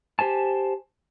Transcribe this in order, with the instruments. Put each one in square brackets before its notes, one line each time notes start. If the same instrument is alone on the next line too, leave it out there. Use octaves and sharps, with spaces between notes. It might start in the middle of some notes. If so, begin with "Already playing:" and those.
[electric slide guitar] G4 C5 G#5 A5